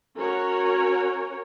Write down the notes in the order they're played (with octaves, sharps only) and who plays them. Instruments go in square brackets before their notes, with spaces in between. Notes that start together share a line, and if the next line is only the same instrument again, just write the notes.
[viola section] C#4 F#4 A#4 C#5